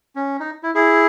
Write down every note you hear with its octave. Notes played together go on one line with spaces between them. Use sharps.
C#4
D#4
E4
E4 G#4